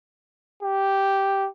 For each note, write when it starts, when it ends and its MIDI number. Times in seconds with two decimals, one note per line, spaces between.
0.63 1.48 67